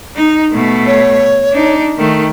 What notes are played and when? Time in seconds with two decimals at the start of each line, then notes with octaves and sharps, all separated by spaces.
0.16 D#4
0.52 B2 A3
0.87 C#5
1.52 D4 D#4
1.98 D#3 A3